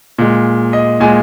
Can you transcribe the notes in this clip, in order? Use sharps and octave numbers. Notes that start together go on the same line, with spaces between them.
A#2 G#3
D#5
A#2 G#3 G#5